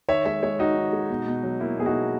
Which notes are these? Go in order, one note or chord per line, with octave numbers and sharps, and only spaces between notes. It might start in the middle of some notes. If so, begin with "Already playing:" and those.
D#3 C#5 E5
G#3 C#5 E5
G#3 C#5 E5
D#3 D#4 F#4
D#3
G#3
B2
B2
F#3
A#3 E4
B2 G#4
D#4 F#4
B2